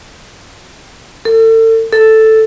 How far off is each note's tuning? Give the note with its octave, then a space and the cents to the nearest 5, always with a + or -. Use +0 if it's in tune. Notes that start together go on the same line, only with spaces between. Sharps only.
A4 +35
A4 +0